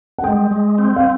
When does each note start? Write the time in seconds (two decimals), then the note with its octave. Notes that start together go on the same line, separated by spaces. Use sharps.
0.18 F#5
0.24 G#3 G5
0.51 G#3
0.78 C4
0.96 F5